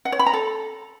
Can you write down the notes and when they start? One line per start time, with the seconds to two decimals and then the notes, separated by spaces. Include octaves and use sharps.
0.05 F#5
0.12 C#5
0.19 B5
0.26 A#5
0.33 A4